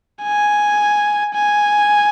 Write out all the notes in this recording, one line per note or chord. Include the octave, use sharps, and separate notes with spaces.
G#5
G#5